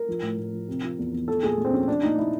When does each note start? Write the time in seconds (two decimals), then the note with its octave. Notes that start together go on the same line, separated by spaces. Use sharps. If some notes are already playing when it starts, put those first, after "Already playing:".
Already playing: A#4
0.08 F3
0.22 A2
0.38 A2
0.53 F3
0.68 C3
0.83 F3
0.99 E2
1.13 E2
1.28 F3 A4
1.43 A#2 G#4
1.58 A#2
1.65 C4
1.73 F3 C#4
1.88 F3 D4
2.03 A#2 D#4
2.18 A#2 E4